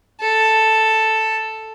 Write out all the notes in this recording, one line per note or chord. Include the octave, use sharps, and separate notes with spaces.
A4